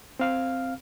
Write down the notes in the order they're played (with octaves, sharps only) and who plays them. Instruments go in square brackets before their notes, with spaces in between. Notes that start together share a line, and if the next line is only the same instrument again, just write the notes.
[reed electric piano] C4 F5 F6